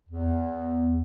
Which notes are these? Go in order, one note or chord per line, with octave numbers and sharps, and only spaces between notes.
E2